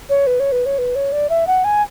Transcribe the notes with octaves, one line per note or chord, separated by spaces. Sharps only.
C#5
B4
C#5
B4
C#5
B4
C#5
D5
E5
F#5
G#5